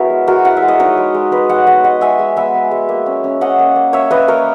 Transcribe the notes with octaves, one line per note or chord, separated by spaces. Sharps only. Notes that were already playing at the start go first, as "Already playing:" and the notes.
Already playing: B3 E4 F#4 G#4 A#4 C#5 E5
G#3
G#3 F#4 A#4
E4 F#5
E5
G#3
D#5
D#4 A#4 C#5
G#3
G#3
G#3 B4 D#5
G#3 D#5 F#5
B3 D#5 F#5
G#3 D#5 F#5
G#3 E5 G#5
G#3
B3 E5 G#5
B3
G#3
A#3
C#4
C#4
C#4 D#5 F#5
A#3
A#3
A#3 C#5 E5
A#3 B4 D#5
A#3 A#4 C#5